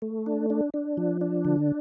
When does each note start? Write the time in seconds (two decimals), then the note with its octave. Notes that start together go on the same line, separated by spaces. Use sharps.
0.02 A3
0.26 D4
0.50 D4
0.74 D4
0.97 F3
1.21 D4
1.45 D3